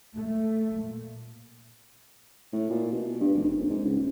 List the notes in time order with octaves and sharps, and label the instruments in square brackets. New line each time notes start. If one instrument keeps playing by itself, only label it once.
[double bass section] A3
A#2
[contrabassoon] A2
A#2
B2
G2
F1
A#1
G#2
C#2
D#1